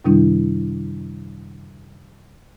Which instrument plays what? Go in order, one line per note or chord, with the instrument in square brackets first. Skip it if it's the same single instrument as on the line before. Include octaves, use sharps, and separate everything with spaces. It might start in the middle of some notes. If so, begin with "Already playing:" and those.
[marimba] F#2 C3 D#3 G3 D4 E4